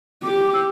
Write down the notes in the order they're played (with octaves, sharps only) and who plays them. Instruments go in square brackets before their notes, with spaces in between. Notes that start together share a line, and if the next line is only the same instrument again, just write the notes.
[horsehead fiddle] G4 [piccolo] D6
[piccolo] E6